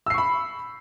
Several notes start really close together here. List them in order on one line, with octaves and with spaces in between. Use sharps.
E6 C7 C#6 B5